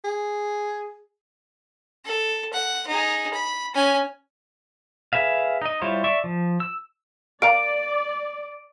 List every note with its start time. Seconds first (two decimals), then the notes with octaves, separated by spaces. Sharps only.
0.04 G#4
2.05 A4
2.53 F#5
2.87 D#4 G#4
3.34 B5
3.74 C#4 G#5
5.13 G#4 B4 E5 F5
5.62 D#4 D#5
5.82 G3 E4 F4 C5 C#5
6.04 D5 E5 C#6
6.24 F3
6.60 E6
7.42 A#4 D5 F5 A#5 D7